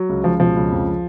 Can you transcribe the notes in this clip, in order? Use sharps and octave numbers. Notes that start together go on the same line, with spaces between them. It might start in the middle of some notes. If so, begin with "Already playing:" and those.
Already playing: F#3
C#2
C#2 F3
B2 F3
C#2
F2